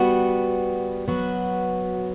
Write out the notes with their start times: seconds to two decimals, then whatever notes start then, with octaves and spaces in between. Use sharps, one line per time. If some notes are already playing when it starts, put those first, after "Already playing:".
Already playing: G3 B3 F#4
1.08 F#3 B3 F#4